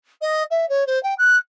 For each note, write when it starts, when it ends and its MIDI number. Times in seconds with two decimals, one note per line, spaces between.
0.21 0.43 75
0.51 0.68 76
0.69 0.86 73
0.87 1.01 72
1.03 1.14 79
1.18 1.37 90